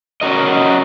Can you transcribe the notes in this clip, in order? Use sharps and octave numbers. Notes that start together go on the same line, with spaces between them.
C#4 F#4 A#4 D#5